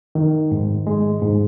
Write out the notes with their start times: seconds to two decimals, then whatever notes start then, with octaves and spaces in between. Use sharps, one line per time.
0.15 D#3
0.51 G#2
0.87 G#3
1.22 G#2